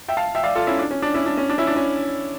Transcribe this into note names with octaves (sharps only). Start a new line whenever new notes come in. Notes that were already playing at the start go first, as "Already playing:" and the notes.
E5 G5
F5 A5
E5 G5
D5 F5
F4 A4
C#4 E4
D4
C#4
D4
C#4 E4
D4
C#4
D4
C#4 E4
D4
C#4